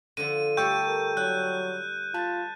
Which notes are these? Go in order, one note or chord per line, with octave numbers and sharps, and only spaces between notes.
D3 F3 D#7
G3 A3 G4 A4 G5 C#6 E6 G6
A#4
F#3 E4 F#6
F4 B4 A5 A6